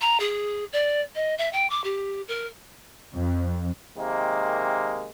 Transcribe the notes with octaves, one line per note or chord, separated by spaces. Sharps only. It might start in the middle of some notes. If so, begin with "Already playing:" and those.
A#5
G#4
D5
D#5
E5
G5
D6
G4
A#4
F2
C3 D#3 G#3 A#3